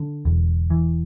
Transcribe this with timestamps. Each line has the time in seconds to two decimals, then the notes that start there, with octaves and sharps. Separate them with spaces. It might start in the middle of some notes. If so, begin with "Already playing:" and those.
Already playing: D3
0.25 E1
0.70 E3